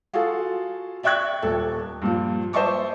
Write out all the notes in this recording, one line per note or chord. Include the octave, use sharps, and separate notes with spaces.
F4 F#4 G#4 A4
D5 E5 G5 C#6 F#6 G#6
D#1 A4
G2 A#2 F3
C5 D#5 E5 A5 C#6 D6